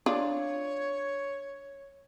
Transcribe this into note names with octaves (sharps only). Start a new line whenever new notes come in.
D4 F4 C#5